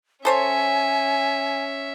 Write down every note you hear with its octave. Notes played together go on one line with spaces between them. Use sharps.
C#4 A4 C5 C#5 E5 G#5